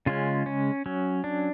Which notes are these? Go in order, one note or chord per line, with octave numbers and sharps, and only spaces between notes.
C#3 G#3 C#4 F4
C#4
F#3 C#4
D4